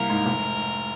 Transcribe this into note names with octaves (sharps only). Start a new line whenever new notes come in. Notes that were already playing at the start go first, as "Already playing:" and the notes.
Already playing: C2 A#3 A#4
G#2
F1